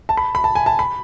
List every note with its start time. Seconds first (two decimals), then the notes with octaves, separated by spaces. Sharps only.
0.09 A5
0.17 B5
0.35 B5
0.44 A5
0.55 G#5
0.66 A5
0.79 B5